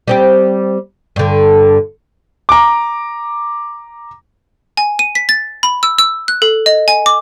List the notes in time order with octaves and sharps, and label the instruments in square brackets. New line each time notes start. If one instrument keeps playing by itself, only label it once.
[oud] G3 C4 G4
G2 D3
[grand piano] A#5 D6
[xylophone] G#5
D#7
B6
A6
B5
E6
E6
F#6
A4
D#5
G#5
D6